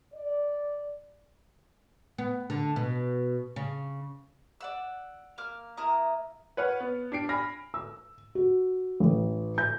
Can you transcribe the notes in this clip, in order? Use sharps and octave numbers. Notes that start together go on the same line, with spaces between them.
D5
B3
D3
B2
C#3
D5 F#5 E6
A#3 D6 F6
A#3 E4 A#5 D#6
B4 C#5 F#5 F6
B3
D4 G4 C7 D7
G#5 B5 F6 A#6
E6
F#4
A1
G6